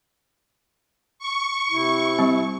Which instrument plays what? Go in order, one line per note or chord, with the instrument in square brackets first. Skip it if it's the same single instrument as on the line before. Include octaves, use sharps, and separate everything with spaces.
[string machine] C#6
[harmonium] C3 E4
[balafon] G3 C4